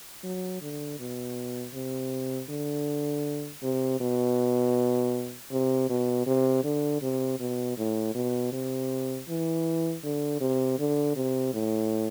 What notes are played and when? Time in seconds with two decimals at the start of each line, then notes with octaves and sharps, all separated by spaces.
0.23 F#3
0.61 D3
0.99 B2
1.74 C3
2.50 D3
3.63 C3
4.00 B2
5.51 C3
5.89 B2
6.27 C3
6.64 D3
7.02 C3
7.40 B2
7.78 A2
8.15 B2
8.52 C3
9.29 E3
10.04 D3
10.41 C3
10.79 D3
11.16 C3
11.54 A2